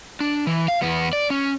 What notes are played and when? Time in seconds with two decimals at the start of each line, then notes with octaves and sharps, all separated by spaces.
0.20 D4
0.47 E3
0.68 F5
0.82 E2 B3
1.13 D5
1.30 C#4